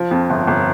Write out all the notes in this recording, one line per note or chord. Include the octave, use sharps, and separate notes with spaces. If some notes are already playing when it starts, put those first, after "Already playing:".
Already playing: F3
F2
G1
G1